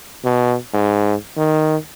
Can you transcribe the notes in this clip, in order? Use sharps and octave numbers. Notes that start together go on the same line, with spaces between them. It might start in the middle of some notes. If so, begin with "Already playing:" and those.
B2
G#2
D#3